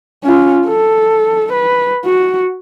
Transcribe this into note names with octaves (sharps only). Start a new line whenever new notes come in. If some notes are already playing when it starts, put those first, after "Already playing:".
C#4 F4
A4
B4
F#4